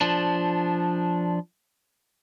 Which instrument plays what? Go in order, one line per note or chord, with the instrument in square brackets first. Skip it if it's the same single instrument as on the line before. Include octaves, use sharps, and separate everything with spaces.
[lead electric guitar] F3 D4